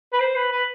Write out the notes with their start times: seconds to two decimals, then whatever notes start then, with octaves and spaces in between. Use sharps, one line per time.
0.13 B4
0.20 C5
0.36 B4
0.51 B4